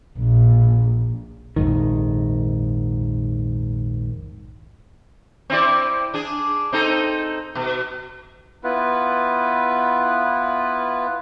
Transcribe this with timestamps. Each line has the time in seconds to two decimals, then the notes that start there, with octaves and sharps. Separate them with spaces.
0.18 A#1
1.56 A#1 F2 G#2 D#3
5.50 C4 E4 D5
6.14 D4 G#4
6.72 C4 D#4 A4
7.55 B2
8.64 B3 E4 F4 B4